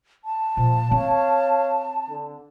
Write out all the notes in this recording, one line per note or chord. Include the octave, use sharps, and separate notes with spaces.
A5
A#2 F3
C4 C#5 F5
D3